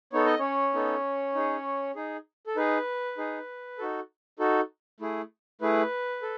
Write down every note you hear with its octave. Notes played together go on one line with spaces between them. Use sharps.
B3 D#4 A4 C#5
D#5
C#4 C#5
B3 D#4 A4
D#4 G#4
D#4 G#4
A4
D#4 G#4 B4
D#4 G#4
D#4 F#4 A4
D#4 F#4 A4
A3 E4 G#4
A3 E4 G#4 B4
A4